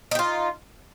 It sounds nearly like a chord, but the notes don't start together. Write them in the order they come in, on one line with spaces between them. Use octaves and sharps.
D#4 G4 F4